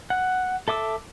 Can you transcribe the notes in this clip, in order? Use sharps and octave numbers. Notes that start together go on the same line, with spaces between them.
F#5
A4 E5 D6 E6